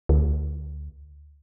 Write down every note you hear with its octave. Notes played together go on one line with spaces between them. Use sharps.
D2